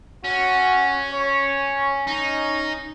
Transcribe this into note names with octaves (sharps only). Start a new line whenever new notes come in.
C#4 F#4
C#5
C#4 D#4